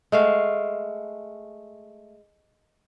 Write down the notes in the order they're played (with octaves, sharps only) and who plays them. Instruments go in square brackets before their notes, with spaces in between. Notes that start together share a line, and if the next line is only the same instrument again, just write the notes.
[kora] G#3 A3 F5